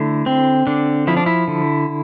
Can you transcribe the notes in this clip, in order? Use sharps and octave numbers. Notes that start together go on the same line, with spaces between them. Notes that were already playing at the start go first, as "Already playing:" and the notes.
Already playing: D3 A3 E4
C4
D3 D4
F3 E4
D4
E4
D3